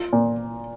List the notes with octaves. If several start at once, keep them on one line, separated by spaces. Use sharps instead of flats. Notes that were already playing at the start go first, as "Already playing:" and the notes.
Already playing: F4
A#2